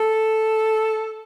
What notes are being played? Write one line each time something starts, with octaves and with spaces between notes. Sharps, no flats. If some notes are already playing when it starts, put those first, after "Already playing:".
Already playing: A4